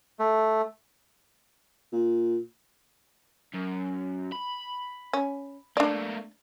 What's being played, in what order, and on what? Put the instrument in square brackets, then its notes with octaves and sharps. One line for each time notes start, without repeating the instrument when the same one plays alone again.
[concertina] A3
[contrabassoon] A#2
[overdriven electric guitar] F#2
B5
[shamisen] C#4
[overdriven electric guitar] A3 A#3 [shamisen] D4 D5